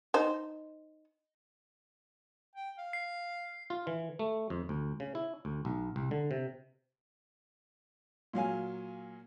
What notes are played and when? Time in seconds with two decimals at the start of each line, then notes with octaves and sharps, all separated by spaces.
0.14 D#4 C5
2.56 G5
2.79 F5
2.93 C7
3.70 F4
3.87 E3
4.19 A3
4.50 F2
4.69 D2
5.00 C#3
5.15 E4
5.45 D2
5.65 B1
5.96 C2
6.11 D3
6.31 C3
8.33 A#2 F#3 F5 G#5